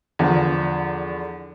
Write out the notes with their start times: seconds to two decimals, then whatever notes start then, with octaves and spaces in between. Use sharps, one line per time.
0.19 E2 D3 F3